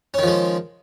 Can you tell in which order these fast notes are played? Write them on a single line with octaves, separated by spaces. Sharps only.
C#4 D#3 F3 G#3